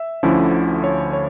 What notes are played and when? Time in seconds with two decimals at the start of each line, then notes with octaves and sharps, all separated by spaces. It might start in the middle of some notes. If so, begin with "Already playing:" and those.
Already playing: E5
0.23 D2 D3 F3 C#4 E4
0.84 C#5
1.13 C#5